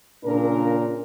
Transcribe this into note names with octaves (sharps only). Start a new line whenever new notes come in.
A#2 C#3 D4 A#4